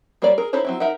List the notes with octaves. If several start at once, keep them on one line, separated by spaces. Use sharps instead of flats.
G3 A#3 A#4 C#5 D5
G#4 A#4
D#4 E4 A4 C5 C#5
F#3 C4 E4
D#4 A#4 E5 F#5